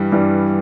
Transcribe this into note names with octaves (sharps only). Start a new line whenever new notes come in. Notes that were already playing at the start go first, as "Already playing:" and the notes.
Already playing: G2 E3 G3
G2 E3 G3